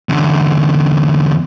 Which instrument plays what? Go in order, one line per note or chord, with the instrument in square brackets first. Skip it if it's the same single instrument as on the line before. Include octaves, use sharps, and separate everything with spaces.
[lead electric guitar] E2 D3